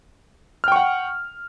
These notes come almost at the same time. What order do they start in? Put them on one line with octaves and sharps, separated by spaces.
F6 G5 C#6 F#5